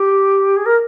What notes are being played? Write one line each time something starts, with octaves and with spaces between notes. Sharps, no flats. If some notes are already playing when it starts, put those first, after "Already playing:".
Already playing: G4
G#4
A#4